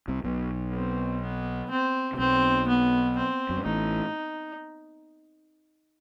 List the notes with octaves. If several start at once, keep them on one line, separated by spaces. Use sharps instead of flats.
C2 C3
B1 B2
C4
B3
C4
C3
B1 B2 C4
B3
C4
F#2
G2
A1 A2 D#4